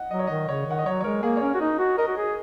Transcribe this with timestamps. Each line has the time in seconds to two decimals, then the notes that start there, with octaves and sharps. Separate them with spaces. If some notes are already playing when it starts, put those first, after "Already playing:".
Already playing: D#5 F#5
0.11 F#3 D#5
0.19 C#5
0.27 D#3 D#5
0.49 C#3 C#5
0.67 D#3 F#5
0.79 D#5
0.86 F#3 C#5
1.01 C#5
1.04 G#3 A#4
1.23 A#3 G#4
1.37 C#5
1.42 C#4 A#4
1.55 F#4
1.60 D#4 D#5
1.79 F#4
1.98 A#4 D#5
2.08 F#4
2.17 G#4